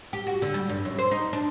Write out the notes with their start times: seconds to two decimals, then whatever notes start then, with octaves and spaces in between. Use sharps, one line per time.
0.13 G4
0.27 F#4
0.42 D3
0.54 G3
0.69 G2
0.85 F#2
0.99 C5
1.11 D#4
1.33 D4